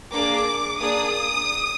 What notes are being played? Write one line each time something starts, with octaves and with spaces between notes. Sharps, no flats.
A#3 D4 G#4 D6
A#3 D4 G#4 D#6